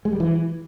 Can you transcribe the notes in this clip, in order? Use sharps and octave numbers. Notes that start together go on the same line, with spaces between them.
G#3
G3
E3